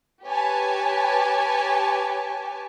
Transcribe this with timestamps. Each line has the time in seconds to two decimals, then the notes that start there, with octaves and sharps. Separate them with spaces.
0.25 G4 B4 C#5 G#5 A5